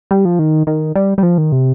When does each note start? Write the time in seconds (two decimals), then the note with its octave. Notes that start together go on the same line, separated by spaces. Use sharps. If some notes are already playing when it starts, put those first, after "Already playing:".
0.11 G3
0.25 F3
0.39 D#3
0.67 D#3
0.95 G3
1.18 G3
1.23 F3
1.38 D#3
1.52 C3